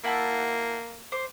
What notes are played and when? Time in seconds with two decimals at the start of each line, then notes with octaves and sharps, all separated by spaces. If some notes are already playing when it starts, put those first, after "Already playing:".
0.04 A#3 E4 F#5 A5
1.12 C5 D6